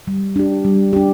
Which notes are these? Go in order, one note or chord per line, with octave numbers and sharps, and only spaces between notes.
G3
D4 G4
G3
D4 G4